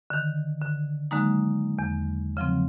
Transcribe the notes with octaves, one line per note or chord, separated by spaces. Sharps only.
D3 D#3
D3
D3 F#3 G#3 A#3 D#4
E2
C#3 F3 F#3 C4